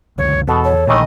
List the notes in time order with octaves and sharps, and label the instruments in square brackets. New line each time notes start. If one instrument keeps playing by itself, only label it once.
[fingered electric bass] C#2 F#2 D3 [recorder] C#5
[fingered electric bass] E2 [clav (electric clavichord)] B2 B3 [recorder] A4
[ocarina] C#5
[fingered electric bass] A#1 A#2 [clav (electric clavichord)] D#3 E3 A3 [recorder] D#5